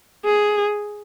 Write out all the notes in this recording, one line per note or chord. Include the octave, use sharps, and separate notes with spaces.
G#4